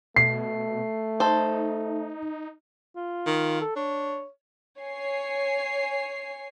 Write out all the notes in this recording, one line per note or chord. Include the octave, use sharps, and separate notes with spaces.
B2 A3 C7
D#4 A4 C5
F4
D#3
A4
D4 C#5
C#5 G#5 C7